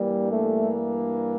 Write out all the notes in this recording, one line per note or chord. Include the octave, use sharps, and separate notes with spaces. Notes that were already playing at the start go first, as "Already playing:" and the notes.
Already playing: G2 E3 G3 A#3 D4
A3